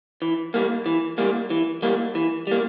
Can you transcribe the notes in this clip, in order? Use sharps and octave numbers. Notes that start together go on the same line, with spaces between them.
E3
G3 A#3
E3
G3 A#3
E3
G3 A#3
E3
G3 A#3